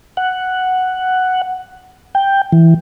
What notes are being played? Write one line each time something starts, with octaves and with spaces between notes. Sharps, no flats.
F#5
G5
E3